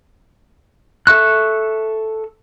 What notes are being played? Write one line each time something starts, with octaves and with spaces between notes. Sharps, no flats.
A4 E5 C#6 F#6